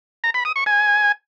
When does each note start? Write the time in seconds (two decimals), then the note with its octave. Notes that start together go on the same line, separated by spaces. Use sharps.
0.24 A#5
0.34 B5
0.45 D#6
0.56 C#6
0.66 G#5